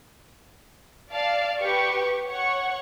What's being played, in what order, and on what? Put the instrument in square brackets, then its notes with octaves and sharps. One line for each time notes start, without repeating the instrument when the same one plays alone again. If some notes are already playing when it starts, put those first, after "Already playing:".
[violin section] D5 F5 A5
G4 B4 C#6
C#5 F#5 C#6